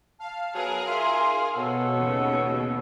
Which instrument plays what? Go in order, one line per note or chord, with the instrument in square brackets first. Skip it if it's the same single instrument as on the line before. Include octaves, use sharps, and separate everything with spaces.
[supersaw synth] F5 [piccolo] A5
[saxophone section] F#3 B3 [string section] G#4 A#4 G#5
[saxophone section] D#4 F4 E5 [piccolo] C6
[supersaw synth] B2 [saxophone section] A4 C#5 [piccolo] F#5
[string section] D#2 C#3